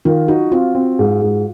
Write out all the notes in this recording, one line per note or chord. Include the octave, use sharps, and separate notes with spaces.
D#3 F4
D#4 F#4
C4 F4
C4
G#2
G#2